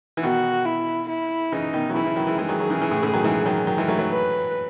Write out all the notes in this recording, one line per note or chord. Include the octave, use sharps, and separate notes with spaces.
E3
B2 D#3 F#4
E4
E4
C#3 E3 D#4
B2 D#3
F#3
C#3 E3 E4
C#3 E3
D#3 F#3
E3 G#3
E3 G#3 G#4
D#3 F#3
D#3 F#3
C#3 E3
C#3 E3
A2 C#3
A2 C#3
D#3 F#3
E3 G#3
D#3 F#3
D#3 F#3
E3 G#3
F#3 A3
F#3 A3
B4